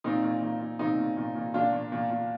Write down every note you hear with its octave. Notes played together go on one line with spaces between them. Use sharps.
A#2 C4 D#4
A#2
A#2
A#2
A#2 C4 D#4
A#2
A#2
A#2
A#2 D4 F4
A#2
A#2
A#2